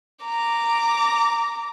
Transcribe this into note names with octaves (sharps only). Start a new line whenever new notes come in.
A#5 D6